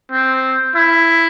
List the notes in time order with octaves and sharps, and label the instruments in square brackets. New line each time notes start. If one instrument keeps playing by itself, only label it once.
[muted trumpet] C4
E4